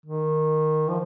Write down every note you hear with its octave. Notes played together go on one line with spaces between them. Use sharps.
D#3
F3